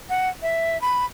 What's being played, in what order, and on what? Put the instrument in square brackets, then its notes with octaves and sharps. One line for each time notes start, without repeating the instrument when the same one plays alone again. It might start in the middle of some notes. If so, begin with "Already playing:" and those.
[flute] F#5
E5
B5